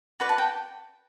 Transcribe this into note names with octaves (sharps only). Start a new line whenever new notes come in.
F#4 B4 D5
A5
G5